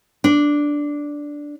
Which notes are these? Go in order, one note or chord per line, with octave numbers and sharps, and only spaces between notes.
D4